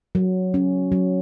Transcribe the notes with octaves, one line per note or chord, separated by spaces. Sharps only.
F#3
C#4
F#3